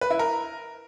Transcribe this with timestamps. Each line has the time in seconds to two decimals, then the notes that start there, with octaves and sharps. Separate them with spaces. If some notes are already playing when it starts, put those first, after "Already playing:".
0.01 B4
0.10 E4
0.19 A#4